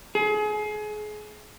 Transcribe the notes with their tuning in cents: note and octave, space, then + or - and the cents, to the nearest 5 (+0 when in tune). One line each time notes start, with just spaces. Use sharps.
G#4 +30